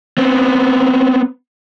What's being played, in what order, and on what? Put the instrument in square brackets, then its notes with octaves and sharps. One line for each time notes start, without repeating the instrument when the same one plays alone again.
[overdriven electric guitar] B3 C4